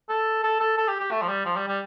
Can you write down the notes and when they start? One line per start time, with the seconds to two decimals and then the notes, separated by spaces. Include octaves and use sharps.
0.09 A4
0.44 A4
0.60 A4
0.77 A4
0.88 G4
1.00 G4
1.11 A3
1.22 F3
1.28 G3
1.45 F3
1.57 G3
1.68 G3